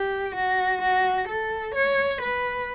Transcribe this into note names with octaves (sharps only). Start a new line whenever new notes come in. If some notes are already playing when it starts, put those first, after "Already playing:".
Already playing: G4
F#4
F#4
A4
C#5
B4